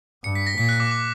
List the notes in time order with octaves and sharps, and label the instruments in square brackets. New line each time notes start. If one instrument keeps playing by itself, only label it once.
[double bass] G2 [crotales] C#7
[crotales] B6
A#6
[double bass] A#2 [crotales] B6
[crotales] F#6
D6
D6